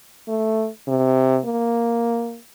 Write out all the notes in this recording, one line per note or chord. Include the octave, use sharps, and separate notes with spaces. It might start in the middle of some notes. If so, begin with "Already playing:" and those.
A3
C3
A#3